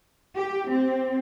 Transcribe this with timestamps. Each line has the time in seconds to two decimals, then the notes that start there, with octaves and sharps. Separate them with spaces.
0.35 G4
0.69 C4